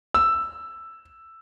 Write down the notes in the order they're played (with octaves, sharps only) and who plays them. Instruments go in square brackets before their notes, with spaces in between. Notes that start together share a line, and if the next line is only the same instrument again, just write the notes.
[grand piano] E6